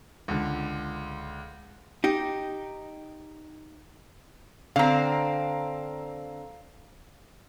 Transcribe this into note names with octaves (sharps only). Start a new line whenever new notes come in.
C#2 D3
D#4 G4
D3 C4 F5 A#5